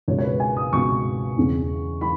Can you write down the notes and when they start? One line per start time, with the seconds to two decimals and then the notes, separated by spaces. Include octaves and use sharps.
0.08 C#2 B2 G#3 C#5
0.19 C#5
0.23 B4
0.40 G#5
0.57 D#6
0.73 C#2 B2 G#3 C#6
1.37 E2 C#3 E3
2.01 E3 B5